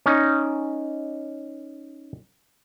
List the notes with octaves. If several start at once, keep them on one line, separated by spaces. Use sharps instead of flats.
C#4 D#4